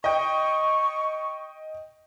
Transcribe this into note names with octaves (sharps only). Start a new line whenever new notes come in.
D#5 G5 C#6